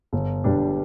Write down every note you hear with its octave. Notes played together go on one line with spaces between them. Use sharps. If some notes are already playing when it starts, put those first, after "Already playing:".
G1
G2 G3 D4